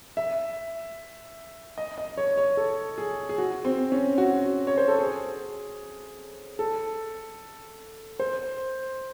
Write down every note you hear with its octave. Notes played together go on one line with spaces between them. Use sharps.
E5
D#5
D#5
C#5
C#5
A4
G#4
G#4
F#4
C4
C#4
F#4
C#5
C5
A4
G#4
A4
C5